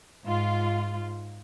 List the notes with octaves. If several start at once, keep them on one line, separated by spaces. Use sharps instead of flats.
G#2 F4